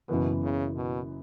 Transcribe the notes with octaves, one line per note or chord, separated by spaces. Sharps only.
F#1 F#2 B2 E3 B3
C#3
B2